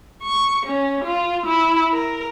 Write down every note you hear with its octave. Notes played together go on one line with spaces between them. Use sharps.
C#6
C#4
F4
E4
A#4